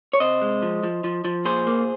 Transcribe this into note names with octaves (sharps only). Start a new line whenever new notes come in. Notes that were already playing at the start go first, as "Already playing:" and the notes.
C#5
C3 C5 D#5
G#3
F3
F3
F3
F3
A#2 G#4 C5
A#3